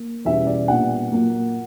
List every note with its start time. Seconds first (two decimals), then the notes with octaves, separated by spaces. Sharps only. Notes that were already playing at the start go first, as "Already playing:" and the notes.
Already playing: A#3
0.25 E2 B2 G3 C#4 E5
0.46 D5
0.68 A#2 G3 B3 D4 F#5
1.11 A#2 F#3 A#3